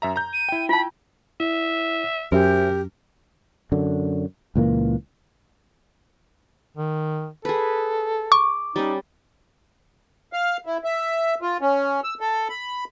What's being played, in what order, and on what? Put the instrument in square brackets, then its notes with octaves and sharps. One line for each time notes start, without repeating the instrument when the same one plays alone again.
[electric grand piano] F#2 E5 A#5
A#5 G6
[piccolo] D#7
[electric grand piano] E4 G5
[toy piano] F4 A5 [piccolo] B5
[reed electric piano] E4 [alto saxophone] E5
[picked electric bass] F#2 [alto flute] G4 [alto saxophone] A#4 [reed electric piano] C5 E5 G#5
[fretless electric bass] F#2 D3
C#2 A#2 E3 A#3
[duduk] D#3
[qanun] G#4 B4 [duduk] A4
[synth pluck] C#6 [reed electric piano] D6
[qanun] G3 C#4 [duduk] D#4
[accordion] F5
E4
E5
F4
C#4
E6
A4
B5